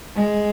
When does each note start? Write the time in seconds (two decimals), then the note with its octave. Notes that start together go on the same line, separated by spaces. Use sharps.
0.16 G#3